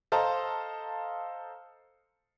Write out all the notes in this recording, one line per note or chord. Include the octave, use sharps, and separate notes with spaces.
A4 C5 D#5 F5 A5 A#5